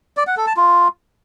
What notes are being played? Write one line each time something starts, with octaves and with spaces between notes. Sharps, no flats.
D5
F#5
A4
A5
F4